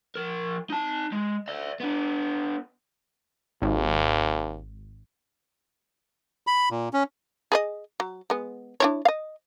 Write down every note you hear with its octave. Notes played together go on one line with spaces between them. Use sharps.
F3 A#4
D#4 A5
G#3
D5 E5
B3 D4
G#1 D#2
B5
A#2
C#4
G#4 B4 D#5
F#3
G#3 B3
D4 E4 C#5
D#5 F5